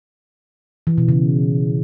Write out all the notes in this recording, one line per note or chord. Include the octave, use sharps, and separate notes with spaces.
E3
B2
C#3